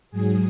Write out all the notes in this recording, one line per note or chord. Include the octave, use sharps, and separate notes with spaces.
G#2 F#3 G#4